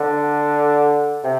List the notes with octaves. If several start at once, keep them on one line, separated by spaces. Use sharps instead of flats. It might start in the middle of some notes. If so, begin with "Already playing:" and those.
Already playing: D3
C3